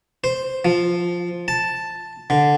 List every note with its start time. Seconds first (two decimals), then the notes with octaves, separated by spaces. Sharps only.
0.24 C5
0.65 F3
1.48 A5
2.30 D3